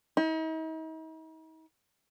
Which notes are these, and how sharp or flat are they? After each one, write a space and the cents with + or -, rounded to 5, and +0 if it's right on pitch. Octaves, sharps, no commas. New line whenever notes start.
D#4 +45